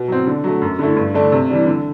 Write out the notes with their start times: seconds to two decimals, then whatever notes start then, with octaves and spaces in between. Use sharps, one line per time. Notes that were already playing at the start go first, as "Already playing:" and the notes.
Already playing: B2
0.08 F#3 C4
0.27 D3
0.44 F#3 A3
0.62 F#2
0.79 D3 A3 E4
0.97 G2
1.14 D3 A3 D4
1.32 C3
1.50 E3 G3 D4
1.66 D3